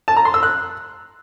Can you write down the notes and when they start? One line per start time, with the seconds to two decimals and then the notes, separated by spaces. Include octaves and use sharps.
0.08 A5
0.17 A#5
0.25 C6
0.34 E6
0.43 F#6